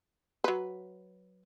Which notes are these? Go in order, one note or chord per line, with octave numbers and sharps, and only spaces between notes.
F#3 B4